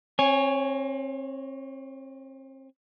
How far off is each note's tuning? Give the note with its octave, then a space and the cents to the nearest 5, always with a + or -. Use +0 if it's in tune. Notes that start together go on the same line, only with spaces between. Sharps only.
C4 +35 C#5 +0 G#5 +0